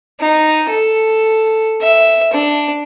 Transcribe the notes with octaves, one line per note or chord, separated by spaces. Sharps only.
D#4
A4
E5
D4